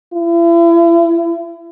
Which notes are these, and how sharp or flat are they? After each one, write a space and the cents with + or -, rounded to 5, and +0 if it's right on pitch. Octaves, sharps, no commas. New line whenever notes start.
E4 +40